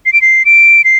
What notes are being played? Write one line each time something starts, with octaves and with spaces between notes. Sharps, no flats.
C7
D7
C7
D7
C7